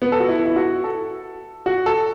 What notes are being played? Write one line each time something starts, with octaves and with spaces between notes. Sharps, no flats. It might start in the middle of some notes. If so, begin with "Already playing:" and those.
B3
A4
F#4
E4
E4
F#4
A4
F#4
A4